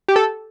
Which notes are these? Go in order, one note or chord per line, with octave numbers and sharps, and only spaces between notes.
G4
A4